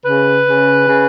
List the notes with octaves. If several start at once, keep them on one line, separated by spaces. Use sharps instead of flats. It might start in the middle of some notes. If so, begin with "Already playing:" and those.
C#3 B4
C#3
C#3